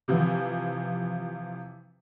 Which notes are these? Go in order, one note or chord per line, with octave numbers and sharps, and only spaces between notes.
C3 E3 F3